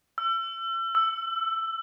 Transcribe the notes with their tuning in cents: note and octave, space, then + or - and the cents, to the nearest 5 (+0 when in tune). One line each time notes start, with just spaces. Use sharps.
E6 +40
E6 +10